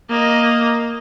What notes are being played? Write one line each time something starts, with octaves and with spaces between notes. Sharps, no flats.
A#3 D#5